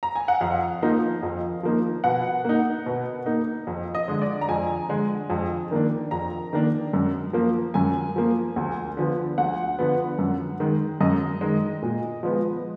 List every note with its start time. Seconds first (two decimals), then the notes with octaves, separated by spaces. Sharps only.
0.03 A#5
0.15 G#5
0.28 F#5
0.41 F2 F5
0.82 F3 A#3 D#4
1.23 F2
1.63 F3 A#3 D#4
2.04 B2 F#5
2.45 A#3 D#4
2.86 B2
3.26 A#3 D#4
3.67 F2
3.95 D#5
4.08 D3 G#3
4.22 D5
4.41 A#5
4.49 F2 G#5
4.89 D3 G#3
5.30 F2
5.71 D#3 A#3 D4
6.11 F2 A#5
6.53 D#3 A#3 D4
6.93 F#2
7.33 F3 A#3
7.74 F#2 G#5
8.16 F3 A#3
8.56 D2
8.97 D3 F3 B3
9.38 D2 F#5
9.79 D3 F3 B3
10.19 F#2
10.60 D#3 G#3
11.01 F#2 D#5
11.41 D#3 G#3
11.82 A#2
12.23 F3 G#3 B3